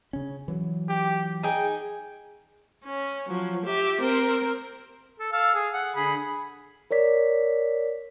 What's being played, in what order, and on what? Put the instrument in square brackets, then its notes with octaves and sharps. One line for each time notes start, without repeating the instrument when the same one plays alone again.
[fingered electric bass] C#3 C#4
E3 F#3
[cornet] G4
[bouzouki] D#4 G#4 [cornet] G5
[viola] C#4
F3 F#3
G4 E5
C4 A#4
[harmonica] A4
A4 F5 E6
G#4
F#5
D3 G#4 B5
[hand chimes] A#4 C#5 D5 B6